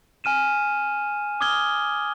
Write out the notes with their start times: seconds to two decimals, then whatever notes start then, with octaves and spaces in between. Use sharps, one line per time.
0.24 G#5 F6 D#7 E7
1.41 D6 D#6 F6 G#6 G7